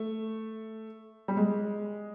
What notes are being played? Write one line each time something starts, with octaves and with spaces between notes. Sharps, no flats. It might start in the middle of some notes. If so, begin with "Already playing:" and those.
Already playing: A3
G3
G#3